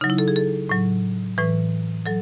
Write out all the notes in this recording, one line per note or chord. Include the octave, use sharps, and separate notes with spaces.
C#3 F#3 D#4
E4
A4
G#4
A4
A2 F#3
A2 E3 B4
F#3 A4